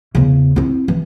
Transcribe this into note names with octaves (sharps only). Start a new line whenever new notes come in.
E2 C#3
C4 E4
E3